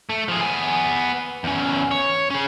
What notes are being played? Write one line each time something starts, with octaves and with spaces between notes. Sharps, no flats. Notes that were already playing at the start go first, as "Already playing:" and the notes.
A3
F3 G#4
B3 G#5
E2 C#4
C#5
C#4 G#4